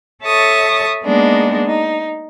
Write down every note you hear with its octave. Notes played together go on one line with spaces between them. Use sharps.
A4 C#5 E5 A5 C#6 D#6
G#3 A#3 B3 D4 D#4
D#4